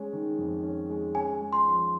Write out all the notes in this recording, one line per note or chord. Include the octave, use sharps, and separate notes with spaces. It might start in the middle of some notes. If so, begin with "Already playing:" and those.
Already playing: G#3 C#4
D#3
F2
C#4
G#3
C#4 G#5
G#3
C6
F3